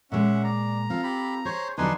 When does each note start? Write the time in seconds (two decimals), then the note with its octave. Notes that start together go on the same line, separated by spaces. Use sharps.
0.12 A#2 G#3 C#4 E5 F#5
0.44 D5 A#5
0.90 C4 F4 A4 F5
1.03 G4 B5
1.45 G#4 C5 C#5
1.78 E2 D3 F#3 D4 D#4 B4 G#5 C6